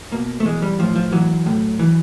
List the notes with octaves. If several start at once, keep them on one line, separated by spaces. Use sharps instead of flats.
B2 A#3
A3
E3 G#3
G3
A2 F3
F3
E3 F#3
A2
E3